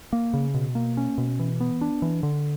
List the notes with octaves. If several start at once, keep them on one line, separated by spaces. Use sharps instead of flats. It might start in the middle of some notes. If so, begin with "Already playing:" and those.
A#3
C#3
B2
A#3
C#4
B2
E3
B3
D4
E3
D3